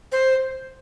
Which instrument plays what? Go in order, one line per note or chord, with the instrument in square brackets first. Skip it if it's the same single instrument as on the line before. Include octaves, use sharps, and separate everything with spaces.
[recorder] C5